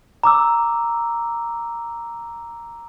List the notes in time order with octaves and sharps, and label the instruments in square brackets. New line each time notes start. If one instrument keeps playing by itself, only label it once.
[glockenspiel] A#5 D6 E6